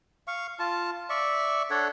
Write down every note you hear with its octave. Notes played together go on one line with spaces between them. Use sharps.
F5 C#6
F4 A5
D5 E5 C#6
D4 A4 C#5 F#5